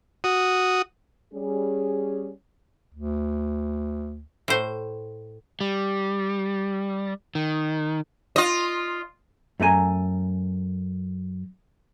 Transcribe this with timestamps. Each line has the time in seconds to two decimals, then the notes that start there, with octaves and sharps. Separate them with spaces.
0.24 F#4 D#6
1.33 G3 C#4 G#4
2.95 D2
4.48 A2 C5
5.61 G3
7.35 D#3
8.36 F4 D#5
9.60 F#2 A3 D4 G#5 A#5